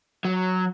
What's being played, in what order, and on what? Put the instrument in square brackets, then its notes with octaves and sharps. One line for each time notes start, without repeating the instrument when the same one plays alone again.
[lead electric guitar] F#3